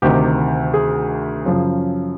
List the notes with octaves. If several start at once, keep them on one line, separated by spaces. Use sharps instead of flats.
D2 C3 D#3 G4
G#4
F#2 C#3 F3